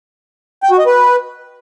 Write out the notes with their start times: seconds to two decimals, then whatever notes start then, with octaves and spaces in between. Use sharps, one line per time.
0.63 G5
0.71 F#4
0.79 D#5
0.86 B4